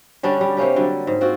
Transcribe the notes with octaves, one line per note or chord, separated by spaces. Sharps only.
D3 G3 C#4 D4
G3
C3 A#3 C#4 G4
D3 F#3 G3
G#2
C4 F4 F#4